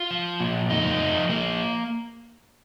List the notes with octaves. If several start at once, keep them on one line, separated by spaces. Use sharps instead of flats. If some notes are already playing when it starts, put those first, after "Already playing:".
Already playing: F4
F3
A#2
F2 D#4
F3
F3 A#3